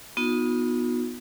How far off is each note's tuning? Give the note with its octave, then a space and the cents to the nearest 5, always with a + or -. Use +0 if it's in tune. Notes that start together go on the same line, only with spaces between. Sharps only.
B3 -15 D#4 +0 F#4 -45